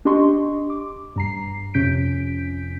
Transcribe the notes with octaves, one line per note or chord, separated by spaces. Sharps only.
D4 G4 D#5 C6 C#6
D6
G2 A#5 C7
F2 C3 C#4 G6 B6 D7